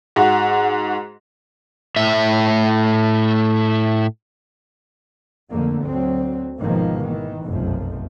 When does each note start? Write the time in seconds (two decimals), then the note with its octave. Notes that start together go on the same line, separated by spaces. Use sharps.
0.16 G#2 F#4
1.96 A2 E5
5.50 F2 D3 A3 A#3
5.83 D2 F#3 C4
6.60 G#1 B2 D#3 F3 A#3
7.02 D#3 E3
7.47 F1 B1 F#2 F3